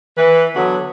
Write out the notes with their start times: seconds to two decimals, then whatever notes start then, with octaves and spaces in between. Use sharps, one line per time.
0.18 E3 B4
0.56 D3 F#3 B3 F#4